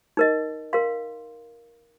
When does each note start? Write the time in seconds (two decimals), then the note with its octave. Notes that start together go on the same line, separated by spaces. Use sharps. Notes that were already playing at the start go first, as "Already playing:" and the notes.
0.17 D#4 A#4 D#5
0.73 A#4 F5 C6